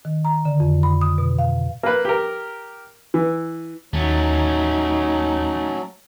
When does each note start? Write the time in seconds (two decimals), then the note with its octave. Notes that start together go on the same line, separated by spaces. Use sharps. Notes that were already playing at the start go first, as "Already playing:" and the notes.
0.05 D#3
0.25 A#5
0.45 D3
0.60 F2
0.83 B5
1.01 D#6
1.18 B2
1.39 F5
1.83 A#3 B4
2.05 G4 A#4
3.14 E3
3.93 D#2 F#3 A3 C#4 D#4